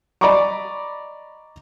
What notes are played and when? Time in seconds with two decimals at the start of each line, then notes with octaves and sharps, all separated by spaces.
0.21 D5 D#5 A#5 B5 C#6 D6